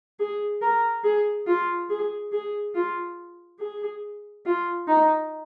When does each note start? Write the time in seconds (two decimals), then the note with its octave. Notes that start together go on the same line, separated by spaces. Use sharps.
0.19 G#4
0.62 A#4
1.04 G#4
1.47 F4
1.90 G#4
2.32 G#4
2.75 F4
3.60 G#4
4.45 F4
4.88 D#4